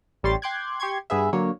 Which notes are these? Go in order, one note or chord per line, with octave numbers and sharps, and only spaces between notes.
A1 G3 C#5 C6 A6
G5 C6 D6 F#6 G#6
G4 C6 C#6 G#6
G2 B3 G#4 B4 E5
D3 F#3 A#3 C#5